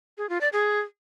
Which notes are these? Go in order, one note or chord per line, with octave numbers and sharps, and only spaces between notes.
G#4
F4
D5
G#4